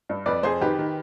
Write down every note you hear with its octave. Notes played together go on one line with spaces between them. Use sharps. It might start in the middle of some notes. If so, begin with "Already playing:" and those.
G2
F2 B4 D5
F2 G#4 C5
D#3 G4 B4
D#3